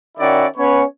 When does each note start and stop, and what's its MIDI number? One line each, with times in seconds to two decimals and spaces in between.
0.18 0.46 51
0.18 0.46 61
0.18 0.46 64
0.18 0.46 66
0.18 0.46 74
0.57 0.83 59
0.57 0.83 61
0.57 0.83 71
0.57 0.83 73